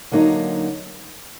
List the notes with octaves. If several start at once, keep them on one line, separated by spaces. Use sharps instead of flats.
D3 F#3 A#3 D#4